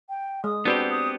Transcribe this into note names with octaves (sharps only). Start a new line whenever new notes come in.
G5
G#3 D#6
B3 C4 D4 F#4 G4 B4
D#6